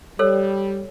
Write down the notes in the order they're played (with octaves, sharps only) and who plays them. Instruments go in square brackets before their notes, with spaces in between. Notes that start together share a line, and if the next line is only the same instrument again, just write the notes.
[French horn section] G3 [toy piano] A4 C#5 E6